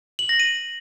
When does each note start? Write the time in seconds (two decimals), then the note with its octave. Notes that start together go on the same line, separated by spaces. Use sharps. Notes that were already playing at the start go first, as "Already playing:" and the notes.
0.19 F#7
0.29 A#6
0.40 D#7